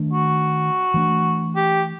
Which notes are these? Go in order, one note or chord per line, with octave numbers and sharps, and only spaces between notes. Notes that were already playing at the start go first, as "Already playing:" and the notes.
Already playing: D#3 A3 D4
F#4
E3 A3 D4
G4